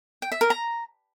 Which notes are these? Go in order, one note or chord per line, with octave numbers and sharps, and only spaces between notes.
G5
E5
A#4
A#5